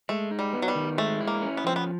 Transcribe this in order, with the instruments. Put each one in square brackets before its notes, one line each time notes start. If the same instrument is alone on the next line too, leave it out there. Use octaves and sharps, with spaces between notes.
[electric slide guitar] G#3 [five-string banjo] A3
[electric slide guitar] D#4
[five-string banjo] G3
[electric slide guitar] B3
[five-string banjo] F#3
G3
[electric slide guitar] D#3
[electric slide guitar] G#3 [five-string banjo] A3
[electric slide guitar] E4
[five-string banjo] A#3
[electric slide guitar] C#4
[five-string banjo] B3
[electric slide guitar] F3 [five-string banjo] C4
[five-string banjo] B3